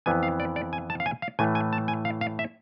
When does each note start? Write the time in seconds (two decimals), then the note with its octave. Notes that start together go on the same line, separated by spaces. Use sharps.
0.06 F2 E3 B3 G#5
0.23 F5
0.40 D5
0.56 D5
0.73 G#5
0.90 A5
1.00 F5
1.06 G#5
1.22 F5
1.39 A2 E3 A3 G#5
1.55 G#5
1.73 A5
1.88 G#5
2.05 F5
2.21 F5
2.39 E5